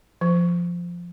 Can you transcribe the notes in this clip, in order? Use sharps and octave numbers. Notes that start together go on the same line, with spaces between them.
F3